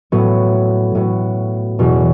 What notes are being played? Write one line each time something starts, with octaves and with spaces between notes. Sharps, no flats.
A2 F#3 B3
A2 F#3 B3
E2 B2 F#3